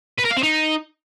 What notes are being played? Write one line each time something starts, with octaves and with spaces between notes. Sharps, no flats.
B4
A#4
F5
C4
D#4